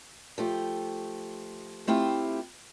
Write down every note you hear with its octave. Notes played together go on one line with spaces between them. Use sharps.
F3 A3 G4
A3 C4 E4 F4 G4